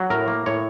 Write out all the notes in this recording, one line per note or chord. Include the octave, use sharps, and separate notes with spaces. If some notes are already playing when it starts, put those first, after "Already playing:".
Already playing: F#3
A2 A#4
A#3
A2 C#5